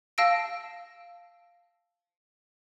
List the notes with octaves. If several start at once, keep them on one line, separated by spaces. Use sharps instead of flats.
F5 A5 E6 A#6 D7